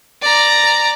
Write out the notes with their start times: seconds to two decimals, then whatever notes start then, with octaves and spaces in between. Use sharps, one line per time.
0.22 D5 A#5